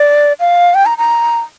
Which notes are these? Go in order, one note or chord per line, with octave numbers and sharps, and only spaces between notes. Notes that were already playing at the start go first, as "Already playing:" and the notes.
Already playing: D5
F5
G5
A#5
A#5